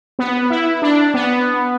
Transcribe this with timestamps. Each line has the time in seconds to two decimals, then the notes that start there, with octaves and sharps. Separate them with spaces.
0.19 B3
0.50 E4
0.82 D4
1.14 B3